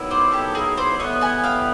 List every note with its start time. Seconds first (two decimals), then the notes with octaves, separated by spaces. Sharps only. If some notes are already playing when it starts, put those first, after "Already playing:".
Already playing: D#3 F#3 B3 E4
0.10 C5 D5
0.32 G4 A4
0.55 G#4 A#4
0.77 C5 D5
0.99 A2 E3 G3 B3 C#5 D#5
1.21 F#5 G#5
1.44 F5 G5